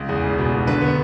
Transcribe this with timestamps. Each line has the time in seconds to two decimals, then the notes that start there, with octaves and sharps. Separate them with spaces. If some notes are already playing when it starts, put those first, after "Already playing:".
Already playing: C#2
0.09 E2 G#4
0.24 F1
0.38 B2
0.53 F1
0.67 D3 B4
0.82 B3